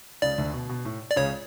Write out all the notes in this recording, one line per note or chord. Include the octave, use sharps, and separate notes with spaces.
C#2 C#3 D5
D2 D3
B2
B2
A2
D5
C#2 C#3 C#5